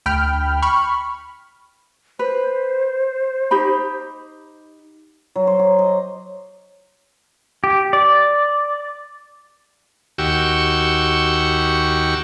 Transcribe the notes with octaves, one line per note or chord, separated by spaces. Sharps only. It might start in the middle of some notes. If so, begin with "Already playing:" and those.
D2 G5 B5 F6
B5 C#6 F6
B4 C5
D#4 G4 B5
F#3
C5
D6
D#5
G4
D5
D#2 F#4 G4 C#6 E6